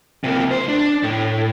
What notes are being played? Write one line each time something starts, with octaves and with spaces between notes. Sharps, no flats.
C3 A#3
C#2 C5
D4
A2